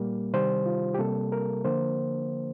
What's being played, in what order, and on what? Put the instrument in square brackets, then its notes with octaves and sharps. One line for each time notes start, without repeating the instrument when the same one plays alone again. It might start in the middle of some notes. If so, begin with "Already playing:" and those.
Already playing: [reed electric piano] A#2 G3 A#3
C3 D#3 G3 C5
F4
G4
C3 G3 A#3 A4
A#4
D3 F3 A#3 C5